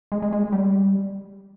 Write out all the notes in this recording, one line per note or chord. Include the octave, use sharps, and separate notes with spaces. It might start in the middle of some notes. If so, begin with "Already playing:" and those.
G#3
G#3
G#3
G3